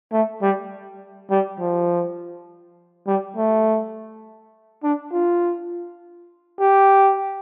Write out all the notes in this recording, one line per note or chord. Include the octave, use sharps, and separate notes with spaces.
A3
G3
G3
F3
G3
A3
D4
F4
G4